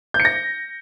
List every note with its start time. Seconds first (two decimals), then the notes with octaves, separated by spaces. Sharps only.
0.14 G6
0.20 C#7
0.25 A#6